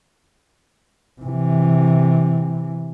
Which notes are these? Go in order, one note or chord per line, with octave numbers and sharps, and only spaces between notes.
C3 E3